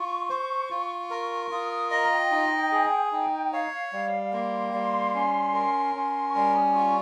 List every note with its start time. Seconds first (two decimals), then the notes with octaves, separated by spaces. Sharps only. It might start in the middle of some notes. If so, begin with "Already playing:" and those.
Already playing: F4 C#6
0.30 C5
0.70 F4
1.11 A#4
1.43 C#6
1.51 F4 D#6
1.70 D#6
1.91 D#5 A#5
2.04 F5
2.12 G5
2.32 D#4
2.72 G#4
3.06 G#5
3.12 D#4 G5
3.47 G5
3.52 C#5 F5
3.93 G3 F5
4.33 A#3 C6
4.74 G3
5.14 C#4
5.54 A#4
5.95 C#4
6.29 C#6
6.35 G3 C6
6.56 D#6
6.75 F4 C#6